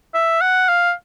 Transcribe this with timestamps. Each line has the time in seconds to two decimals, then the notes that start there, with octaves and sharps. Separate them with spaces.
0.14 E5
0.41 F#5
0.69 F5